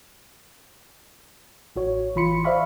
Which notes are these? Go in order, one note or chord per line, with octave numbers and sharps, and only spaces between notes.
A1 F#4 C#5
A1 E3 F4 B5 C6 C#7
C5 D5 E5 F5 B5 C#6